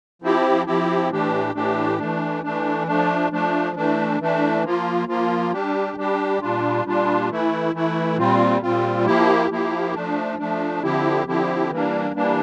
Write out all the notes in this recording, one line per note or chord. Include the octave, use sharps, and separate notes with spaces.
F3 C4 E4 G4
F3 C4 E4 G4
A2 E3 A3 D4 G4
A2 E3 A3 D4 G4
E3 A3 D4
E3 A3 D4
F3 A3 D4
F3 A3 D4
E3 A3 D4
E3 A3 D4
F3 A#3 F4
F3 A#3 F4
G3 D4 G4
G3 D4 G4
A#2 G3 D4 F4
A#2 G3 D4 F4
E3 A3 E4
E3 A3 E4
A#2 G3 C4 F4
A#2 G3 C4 F4
F3 A#3 E4 G4
F3 A#3 E4 G4
F3 A3 D4
F3 A3 D4
D3 F3 C4 E4 G4
D3 F3 C4 E4 G4
E3 G3 A#3 D4
E3 G3 A#3 D4